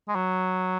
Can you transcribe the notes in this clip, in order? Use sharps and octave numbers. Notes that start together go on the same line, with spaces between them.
G#3
F#3